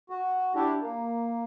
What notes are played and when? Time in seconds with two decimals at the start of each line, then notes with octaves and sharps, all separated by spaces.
0.10 F#4
0.55 D4 E4 G4
0.81 A#3